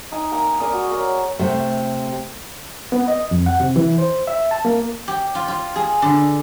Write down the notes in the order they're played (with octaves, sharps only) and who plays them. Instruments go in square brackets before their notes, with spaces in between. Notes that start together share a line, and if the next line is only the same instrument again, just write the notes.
[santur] D#4 G#5
A#3 A#5 D6
G#4 A#4 D5 D#6
F#4
A#4 C#5
[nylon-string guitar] C3 A3
[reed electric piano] B3
D#5
F2
F#5
C3
E3
C5
E5
A5
A#3
[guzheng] G4
F4
F4
G#4
D3